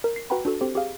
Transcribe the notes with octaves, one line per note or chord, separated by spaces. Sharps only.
A#4
C7
F#4 B4 F#5 G5 A#5 B5
D4 F#4 A4
C4 G4 A4 C5
G4 G#4 F5